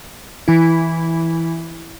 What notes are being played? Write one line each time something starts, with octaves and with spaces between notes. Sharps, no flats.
E3 E4